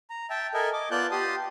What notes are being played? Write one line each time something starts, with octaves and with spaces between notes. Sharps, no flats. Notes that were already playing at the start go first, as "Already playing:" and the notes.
A#5
E5 G5 A5
A4 A#4 D#5 E5 G#5
D#5 D6
B3 F4 D5 A5 F#6 G6
G4 A5 C6 D#6